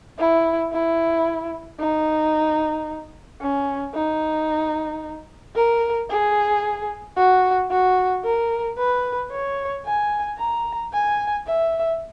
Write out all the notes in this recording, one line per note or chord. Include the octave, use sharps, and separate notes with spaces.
E4
E4
D#4
C#4
D#4
A#4
G#4
F#4
F#4
A#4
B4
C#5
G#5
A#5
G#5
E5